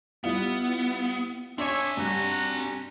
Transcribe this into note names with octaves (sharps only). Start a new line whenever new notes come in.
G3 B3 E4 F4
C4 D4 C#5 D5 E5 G#5 D6
G2 G3 F#4 A#5